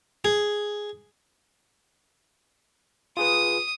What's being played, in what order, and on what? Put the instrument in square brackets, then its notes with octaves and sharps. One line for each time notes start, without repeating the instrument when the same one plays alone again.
[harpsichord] G#4
[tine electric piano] F4 G#4 B4 [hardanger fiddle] D#6